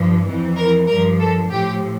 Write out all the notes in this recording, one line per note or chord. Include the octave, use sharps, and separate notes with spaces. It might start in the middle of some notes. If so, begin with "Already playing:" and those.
Already playing: G2 F3
F2 E3
A#4
G2 F3 A#4
A4
A2 F3 G4